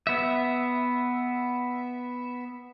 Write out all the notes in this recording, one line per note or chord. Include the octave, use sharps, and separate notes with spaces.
B3 E5